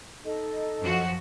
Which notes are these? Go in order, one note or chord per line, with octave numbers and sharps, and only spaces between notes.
D#4 A4 D#5
F#2 F3 F#4